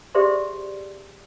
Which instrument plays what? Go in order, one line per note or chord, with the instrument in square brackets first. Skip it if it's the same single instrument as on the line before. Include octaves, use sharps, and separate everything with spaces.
[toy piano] G4 G#4 C5 D5 E5 C6